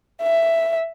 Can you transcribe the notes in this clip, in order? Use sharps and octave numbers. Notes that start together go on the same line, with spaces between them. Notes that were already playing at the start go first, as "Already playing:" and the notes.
E5